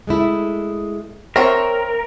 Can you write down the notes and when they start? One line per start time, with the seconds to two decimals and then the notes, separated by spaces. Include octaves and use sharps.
0.07 G#3 A3 E4
1.36 C4 A#4 C#5 E5